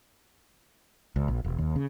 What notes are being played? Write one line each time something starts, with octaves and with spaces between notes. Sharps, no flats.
C#2
A#1
E1
D#2
C#3